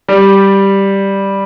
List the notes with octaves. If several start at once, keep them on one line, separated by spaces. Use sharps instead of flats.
G3